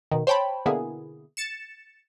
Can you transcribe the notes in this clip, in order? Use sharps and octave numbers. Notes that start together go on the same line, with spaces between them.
B2 D#3
C5 C#5 G5 A5 B5
B2 D3 A#3 B3 E4 G#4
A6 C#7 E7